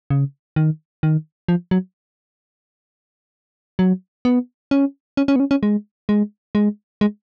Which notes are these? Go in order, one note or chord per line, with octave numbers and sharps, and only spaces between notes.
C#3
D#3
D#3
F3
F#3
F#3
B3
C#4
C#4
C#4
B3
C#4
C#4
G#3
G#3
G#3
G#3